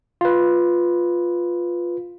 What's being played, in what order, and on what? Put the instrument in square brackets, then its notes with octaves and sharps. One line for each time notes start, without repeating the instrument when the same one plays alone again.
[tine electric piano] F4 B4